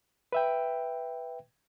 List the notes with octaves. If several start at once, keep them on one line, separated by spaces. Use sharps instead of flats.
B4 E5 G5